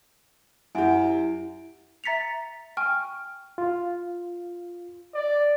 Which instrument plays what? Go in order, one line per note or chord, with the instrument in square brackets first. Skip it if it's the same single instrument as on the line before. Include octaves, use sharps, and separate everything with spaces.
[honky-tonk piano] F#2 G4 [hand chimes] E4 D7 [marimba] E5 F#5 G#5
[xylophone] E5 A#5 A6 B6 C#7 F7
G5 G#5 C#6 F6
[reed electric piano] F4
[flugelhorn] D5